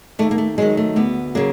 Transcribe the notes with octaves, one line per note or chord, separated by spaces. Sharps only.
D#2 A3
A#3
A3
D#3 F#3 G#3
A3
D2 B3
C#3 F#3 A#3